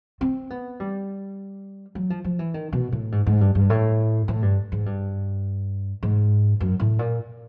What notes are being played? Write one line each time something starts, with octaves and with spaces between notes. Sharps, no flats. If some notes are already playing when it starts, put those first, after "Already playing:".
C4
B3
G3
F#3
F3
F3
E3
D#3
B2
A2
G#2
G#2
G2
G2
A2
A2
G2
G#2
G2
G#2
F#2
A2
A#2